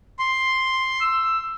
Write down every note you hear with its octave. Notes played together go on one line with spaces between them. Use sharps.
C6
E6